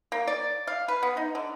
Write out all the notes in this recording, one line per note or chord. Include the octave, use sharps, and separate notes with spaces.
A#3
D5
F5
B4
B3
D#4
D3